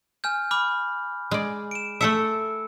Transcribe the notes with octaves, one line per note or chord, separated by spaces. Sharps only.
G#5 F6 G6
B5 D6 F6
G#3 D5
D7 E7
A3 A4 E5 E6 C#7